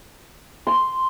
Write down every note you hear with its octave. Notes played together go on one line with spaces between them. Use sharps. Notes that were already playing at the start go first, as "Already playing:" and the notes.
C6